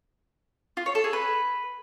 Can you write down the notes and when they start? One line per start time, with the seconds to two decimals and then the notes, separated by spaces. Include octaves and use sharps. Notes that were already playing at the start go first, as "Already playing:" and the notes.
0.77 F4
0.86 C#5
0.95 A4
1.04 G#4
1.13 B4